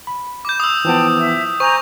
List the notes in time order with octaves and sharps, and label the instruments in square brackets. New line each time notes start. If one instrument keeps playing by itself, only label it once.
[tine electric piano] B5
[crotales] D6 G6
D#6 E6
[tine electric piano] E3 F3 B3 [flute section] G5 A5
[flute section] E5
[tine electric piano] C5 [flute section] G#5 A#5 G6 [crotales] C#6